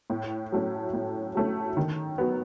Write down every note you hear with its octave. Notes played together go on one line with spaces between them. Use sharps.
A2
F#3 A3 C#4
A2
F#3 A3 C#4
D#3
F#3 B3